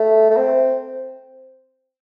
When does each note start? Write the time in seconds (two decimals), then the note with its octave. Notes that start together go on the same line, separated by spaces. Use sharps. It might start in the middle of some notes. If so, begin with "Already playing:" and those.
Already playing: A3
0.30 A3
0.36 C4